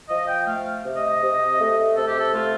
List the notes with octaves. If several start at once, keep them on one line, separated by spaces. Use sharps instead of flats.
F3 D#5
G5
A3 F5
C3
D#5
C3
A3
C3 A4
G4
A4
A3 F4